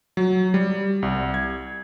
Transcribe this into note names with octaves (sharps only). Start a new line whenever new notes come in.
F#3
G3
C2
G#6